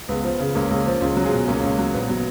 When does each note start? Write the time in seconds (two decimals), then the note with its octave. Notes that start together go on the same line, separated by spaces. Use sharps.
0.09 C#2 B3
0.24 F3
0.40 C#3
0.55 C#2 A#3 C#4
0.71 C#2
0.86 F3
1.01 C#2 C#4 F4
1.17 F#3
1.24 F4 G#4
1.32 B2
1.47 C#2 A#3 C#4
1.63 C#2
1.78 F#3
1.94 A#1 B3
2.09 F#3